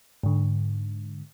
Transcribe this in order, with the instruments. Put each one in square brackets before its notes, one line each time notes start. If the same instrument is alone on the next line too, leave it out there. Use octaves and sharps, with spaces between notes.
[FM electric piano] G#2 D3